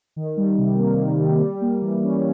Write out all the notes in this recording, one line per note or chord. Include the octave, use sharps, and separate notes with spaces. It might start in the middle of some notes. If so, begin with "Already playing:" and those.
D#3
G3
C3
A#3
D#3
G3
G3
A#3
E3
C#4